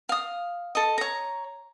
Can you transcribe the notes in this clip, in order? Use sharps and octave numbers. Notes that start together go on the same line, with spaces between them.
F5 D#6
A4 D#5
C#5 A#5